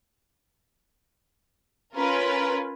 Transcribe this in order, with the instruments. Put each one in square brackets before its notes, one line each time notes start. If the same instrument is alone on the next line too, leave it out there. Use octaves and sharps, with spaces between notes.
[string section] C#4 F4 A#4 B4